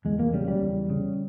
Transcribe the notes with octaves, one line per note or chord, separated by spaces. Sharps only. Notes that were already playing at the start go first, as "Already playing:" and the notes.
E2 G#3
A#3
C#3 G3
G3
E2
C#3